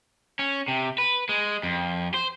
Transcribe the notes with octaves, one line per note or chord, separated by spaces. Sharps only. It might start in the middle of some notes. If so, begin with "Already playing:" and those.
C#4
C3
B4
G#3
F2
C5